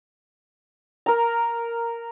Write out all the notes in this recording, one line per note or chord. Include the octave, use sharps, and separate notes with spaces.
A#4 A#5